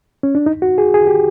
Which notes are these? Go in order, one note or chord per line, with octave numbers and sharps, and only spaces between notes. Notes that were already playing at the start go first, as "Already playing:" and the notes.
C#4
D4
D#4
F#4
G#4
G#4
G4